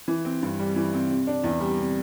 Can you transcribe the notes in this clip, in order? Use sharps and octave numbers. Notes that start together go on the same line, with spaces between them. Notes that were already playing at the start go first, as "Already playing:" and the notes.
E3
C4
G2
G3
E3
C4
C3
D4
E2
G3
C3